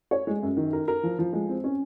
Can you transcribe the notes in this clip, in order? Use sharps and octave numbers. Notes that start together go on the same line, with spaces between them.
C#5
G#3
F#2
D#3
A#4
A#4
F3
F3
G#3
C4
C#4